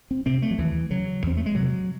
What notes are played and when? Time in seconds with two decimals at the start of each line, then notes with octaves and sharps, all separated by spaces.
0.11 C4
0.26 C3 C4
0.42 A3
0.51 F#3
0.58 D#2 E3
0.91 C#3 F#3
1.23 E2 C4
1.37 A3
1.46 G#3
1.55 C3 F#3